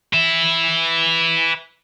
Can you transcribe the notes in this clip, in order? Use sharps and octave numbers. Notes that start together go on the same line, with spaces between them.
B4 E5